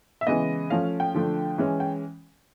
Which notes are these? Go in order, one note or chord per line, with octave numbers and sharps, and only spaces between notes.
E5
C#3 E3 G#3 B3 D#5
F3 A3 C#4 F5
G5
D3 F3 A3 D4
E3 G#3 C#4
G5